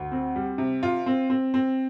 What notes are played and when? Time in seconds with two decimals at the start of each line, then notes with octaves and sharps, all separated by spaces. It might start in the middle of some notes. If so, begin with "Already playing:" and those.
Already playing: D2
0.12 C4
0.36 G3
0.58 C3
0.83 F4
1.06 C4
1.30 C4
1.54 C4